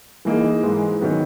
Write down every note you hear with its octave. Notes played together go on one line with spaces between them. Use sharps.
E3 A#3 D#4 G#4
G#2 E3 G#3
D#3 F#3 B3